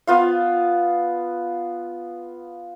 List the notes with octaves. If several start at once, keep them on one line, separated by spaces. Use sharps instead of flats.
B3 F4 F5